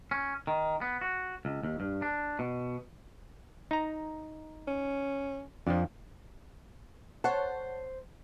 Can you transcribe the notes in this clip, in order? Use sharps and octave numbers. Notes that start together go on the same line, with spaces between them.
C#4
D#3
B3
F#4
C#2
D#2
G2
D4
B2
D#4 A#5
C#4
F2 F3 D4
C5 C#5 F#5 A5